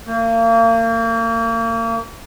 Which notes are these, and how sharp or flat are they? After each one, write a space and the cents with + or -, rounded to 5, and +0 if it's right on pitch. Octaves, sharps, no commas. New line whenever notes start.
A#3 -35